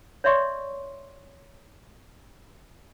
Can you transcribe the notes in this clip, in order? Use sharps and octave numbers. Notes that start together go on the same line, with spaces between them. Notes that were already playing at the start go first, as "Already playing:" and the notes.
C#5 D5 E5 C6 C#6